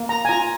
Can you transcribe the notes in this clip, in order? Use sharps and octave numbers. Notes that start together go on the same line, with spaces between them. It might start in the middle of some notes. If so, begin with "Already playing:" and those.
Already playing: A#3
A#5
G#5
F4 A#5